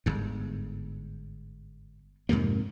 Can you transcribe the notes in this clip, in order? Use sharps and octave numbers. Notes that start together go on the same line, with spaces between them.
G1 G#2
F2 G#2 C3 A#3